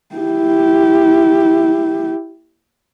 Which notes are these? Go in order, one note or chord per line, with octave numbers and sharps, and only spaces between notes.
E4 G4